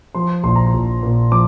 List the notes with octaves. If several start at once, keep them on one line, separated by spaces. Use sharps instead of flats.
F3 C6
A#1 C6
A#5
C6
A#1
A#2
F3 D6